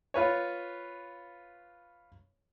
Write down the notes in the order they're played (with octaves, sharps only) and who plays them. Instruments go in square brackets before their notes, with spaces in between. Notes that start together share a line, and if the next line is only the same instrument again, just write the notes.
[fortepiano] F4 B4 C#5